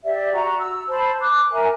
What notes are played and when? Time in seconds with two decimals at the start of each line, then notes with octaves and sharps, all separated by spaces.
0.04 G4 D5 E5
0.32 F#4 A#5
0.58 E6
0.90 C5 A5 B5
1.20 D6 F#6
1.51 A#4 E5 G#5